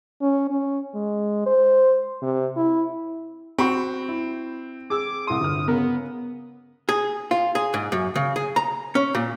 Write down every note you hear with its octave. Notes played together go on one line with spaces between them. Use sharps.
C#4
C#4
G#3
C5
C3
E4
C4 F#4 B5 C#6
E4
G#4 D6 E6
C2 C6 D#6
G1 F6
C#3 B3 A#4
G#4
F4
G#4
G#2
F#2
C#3
G#4
A#5
C#4
A#2